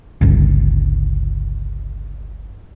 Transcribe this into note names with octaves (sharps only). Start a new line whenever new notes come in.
G1 C#2